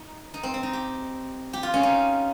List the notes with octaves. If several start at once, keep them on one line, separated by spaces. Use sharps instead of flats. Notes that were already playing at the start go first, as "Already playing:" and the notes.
Already playing: D#4
D#4
C4
C4
D#4
G4
G4
F4
C#4
D#4